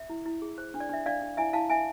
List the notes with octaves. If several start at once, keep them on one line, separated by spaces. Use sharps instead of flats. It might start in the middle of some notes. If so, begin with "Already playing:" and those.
Already playing: E5
E4
E4
G#4
C5
D4
D5
D4 E5
D4 D5 F5
D4
E4 E5 G#5
E4 F5 A5
E4 E5 G#5